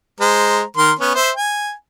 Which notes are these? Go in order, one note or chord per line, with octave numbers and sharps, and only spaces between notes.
G#3 C5 A#5
D#3 A#4 C6
B3 C#4
C5 E5
G#5